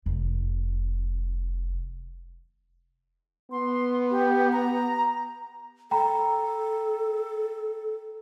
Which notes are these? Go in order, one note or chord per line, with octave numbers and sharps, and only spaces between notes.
F1 D#3
B3 C6
G4
A#5
A4 G5 A#5 B5